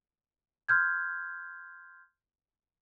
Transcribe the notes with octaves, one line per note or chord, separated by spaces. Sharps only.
C6 F6 G6 G#6